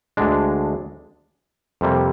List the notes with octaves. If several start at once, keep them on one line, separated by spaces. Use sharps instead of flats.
D2 D3 G#3 D4
F2 C3 G3 A#3